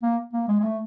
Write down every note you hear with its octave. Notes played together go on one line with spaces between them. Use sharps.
A#3
A#3
G#3
G#3
A3